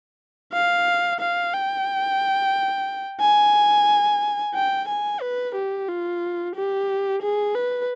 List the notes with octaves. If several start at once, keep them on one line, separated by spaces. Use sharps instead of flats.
F5
F5
G5
G#5
G5
G#5
B4
G4
F4
G4
G#4
B4